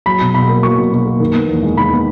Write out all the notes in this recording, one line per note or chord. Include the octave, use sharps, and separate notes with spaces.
F#3 B5
B2
B2 B5
A#3
F#3 C#6
B2
B2
A#3
D#3
B3
E2
G#3
D#3 B5
B3